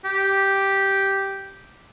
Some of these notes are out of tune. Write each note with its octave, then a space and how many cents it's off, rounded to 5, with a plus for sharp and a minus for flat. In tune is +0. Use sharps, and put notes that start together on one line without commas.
G4 -5